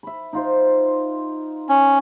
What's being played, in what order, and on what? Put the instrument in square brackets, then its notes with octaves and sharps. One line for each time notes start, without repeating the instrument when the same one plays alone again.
[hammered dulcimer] E5 B5
D#4 F4 C5
[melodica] C#4